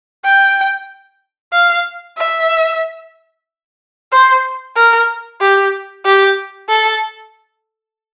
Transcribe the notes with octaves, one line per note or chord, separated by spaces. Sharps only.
G5
F5
E5
C5
A#4
G4
G4
A4